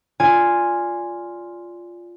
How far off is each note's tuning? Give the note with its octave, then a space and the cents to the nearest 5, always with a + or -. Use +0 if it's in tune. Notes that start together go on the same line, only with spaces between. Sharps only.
F4 +0 D5 -10 G#5 -5